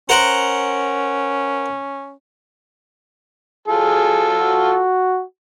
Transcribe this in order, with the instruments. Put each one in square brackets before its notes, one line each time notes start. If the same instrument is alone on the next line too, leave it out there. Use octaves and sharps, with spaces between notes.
[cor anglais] C#4 [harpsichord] A#4 C5 F#5
[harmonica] F#3 F4 A4 [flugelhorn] G#4
[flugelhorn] F#4